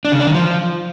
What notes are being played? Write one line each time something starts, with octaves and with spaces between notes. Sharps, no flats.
D4
C#3
D4
D#3
F3